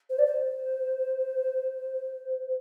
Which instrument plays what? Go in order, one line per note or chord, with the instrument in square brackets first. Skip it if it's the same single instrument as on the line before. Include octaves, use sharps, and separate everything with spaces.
[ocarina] C5
D5
C5